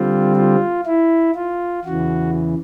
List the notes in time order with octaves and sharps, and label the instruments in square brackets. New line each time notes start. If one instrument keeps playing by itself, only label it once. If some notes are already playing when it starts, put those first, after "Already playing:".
Already playing: [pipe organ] D3 G3 C4 F4
F4
E4
F4
E2 C#3 E3 F#4